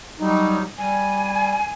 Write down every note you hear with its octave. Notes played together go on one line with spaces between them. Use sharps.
F#3 G3 D#4
G3 G#5